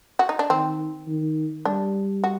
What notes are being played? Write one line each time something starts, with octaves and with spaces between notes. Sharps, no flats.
F#4
D#4
D4
D#3 C4
D#3
G3 D4
F#4